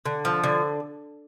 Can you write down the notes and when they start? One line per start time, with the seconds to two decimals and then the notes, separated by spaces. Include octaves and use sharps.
0.05 D3
0.25 F3
0.44 D3